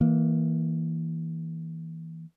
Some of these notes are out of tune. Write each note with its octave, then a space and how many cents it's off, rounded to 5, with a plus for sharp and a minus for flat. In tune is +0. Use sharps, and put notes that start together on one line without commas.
E3 -20 A#3 +0